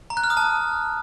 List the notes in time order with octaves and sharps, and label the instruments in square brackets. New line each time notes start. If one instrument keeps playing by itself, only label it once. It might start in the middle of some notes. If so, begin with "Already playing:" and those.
[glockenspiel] A#5
F#6
F6
D#6
A5